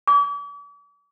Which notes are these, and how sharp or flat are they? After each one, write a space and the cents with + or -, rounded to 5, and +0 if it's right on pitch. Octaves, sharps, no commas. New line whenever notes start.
D6 -45